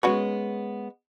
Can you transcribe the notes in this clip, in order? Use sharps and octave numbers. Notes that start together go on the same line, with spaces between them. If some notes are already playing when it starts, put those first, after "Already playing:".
G#3 B3 C#4 F#4 B4 C#5